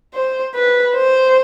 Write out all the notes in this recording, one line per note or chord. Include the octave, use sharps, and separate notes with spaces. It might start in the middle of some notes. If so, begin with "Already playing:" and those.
C5
B4
C5